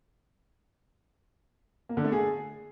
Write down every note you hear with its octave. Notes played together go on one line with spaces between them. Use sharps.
A#3
D3
A3
G#4